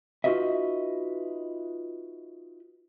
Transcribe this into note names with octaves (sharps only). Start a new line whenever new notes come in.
D#4 F4 F#4 B4 D#5 E5